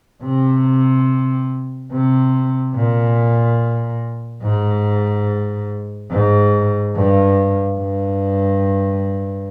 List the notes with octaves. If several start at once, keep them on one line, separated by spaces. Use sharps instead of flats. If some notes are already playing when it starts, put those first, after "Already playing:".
C3
C3
A#2
G#2
G#2
G2
G2